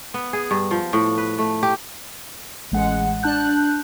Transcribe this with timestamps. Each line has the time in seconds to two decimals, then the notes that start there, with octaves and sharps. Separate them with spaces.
0.14 B3
0.33 G#4
0.51 G2
0.71 F3
0.93 A2
1.18 B4
1.38 A3
1.63 G4
2.72 A1 G#3 F#5
3.23 D4 A5 F#6 G6